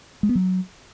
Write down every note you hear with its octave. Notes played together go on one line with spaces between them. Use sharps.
G#3
B3
F#3